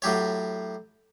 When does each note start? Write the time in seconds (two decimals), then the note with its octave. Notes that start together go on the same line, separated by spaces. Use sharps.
0.02 A2 F#3 G4 C#5